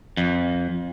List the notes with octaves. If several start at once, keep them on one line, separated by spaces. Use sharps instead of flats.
F2